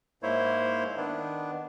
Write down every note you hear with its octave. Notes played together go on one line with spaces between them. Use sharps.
G#2 A#3 E4 C5 C#5
D#3 B3 D4